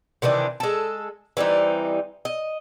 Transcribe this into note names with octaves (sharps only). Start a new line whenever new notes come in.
C3 D#3 E3 D4
G#3 A4
E3 G3 C4 D#4
D#5